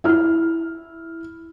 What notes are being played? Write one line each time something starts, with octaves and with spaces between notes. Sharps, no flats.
E4 F6